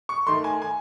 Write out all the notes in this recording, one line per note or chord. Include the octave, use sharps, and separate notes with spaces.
C#6
D#3 A3 C6
G#5
G#5